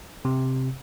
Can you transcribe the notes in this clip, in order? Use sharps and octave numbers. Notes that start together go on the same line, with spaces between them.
C3